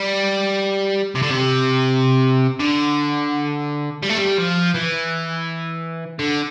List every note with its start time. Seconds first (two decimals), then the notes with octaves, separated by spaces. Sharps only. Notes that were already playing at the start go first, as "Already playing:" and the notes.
Already playing: G3
1.15 C3
1.22 D3
1.30 C3
2.60 D3
4.03 G3
4.10 A3
4.17 G3
4.39 F3
4.75 E3
6.19 D3